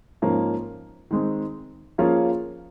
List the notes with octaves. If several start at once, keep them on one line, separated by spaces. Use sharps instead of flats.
G#2 F3 A#3 C#4
D#3 G#3 C4
F3 A#3 C#4 F4 G#4